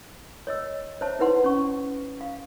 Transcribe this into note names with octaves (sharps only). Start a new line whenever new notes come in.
C#5 D#5 E6
C5 C#5 E5 A5
D#4 E4 B4 F#5 C6
C#4 C#6
F5